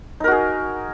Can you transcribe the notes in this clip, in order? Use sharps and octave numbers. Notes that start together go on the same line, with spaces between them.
D#4 F#4 G#4 A#4